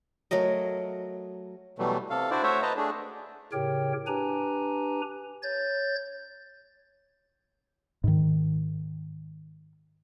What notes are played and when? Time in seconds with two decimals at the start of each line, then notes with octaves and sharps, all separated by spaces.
0.31 F#3 A3 A#4 D#5
1.79 B2 E3 F#3 G3 A3
2.10 C3 A4 F5
2.31 D4 E4 F#4 C5 D5
2.43 A3 F#4 C5 C#5 E5
2.62 B4 C5 D#5 A5 A#5
2.77 A3 D4 G#4
3.52 A2 C#3 G4 A#4 C#5 G5
4.07 D4 G4 B4 G#5 A#5
5.43 C#5 G6 A6
8.04 G#2 D#3